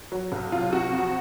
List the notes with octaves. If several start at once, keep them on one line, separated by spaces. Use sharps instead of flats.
F#3
B1
C3 F4
C3 F#4
F2